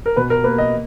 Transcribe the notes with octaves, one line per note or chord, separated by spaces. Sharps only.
A#4
B2 B4
A#4
A#3 B4
D#5